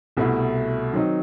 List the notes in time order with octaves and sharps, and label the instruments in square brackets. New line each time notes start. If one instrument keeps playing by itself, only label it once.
[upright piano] C2 B2 A3 E4
D#3 F#3 C4 D#4